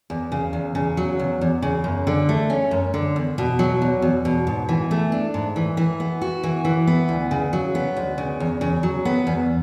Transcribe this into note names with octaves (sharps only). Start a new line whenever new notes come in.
E2
C#3
E2
C#3
F#3
E2
E2
C#3
F#2
D3
A3
C#4
F#2
D3
E2
B2
F#3
E2
E2
B2
G#2
E3
A3
D4
G#2
E3
E3
B3
F#4
E3
E3
B3
D2
C#3
F#3
B3
D2
C#3
E2
C#3
F#3
B3
E2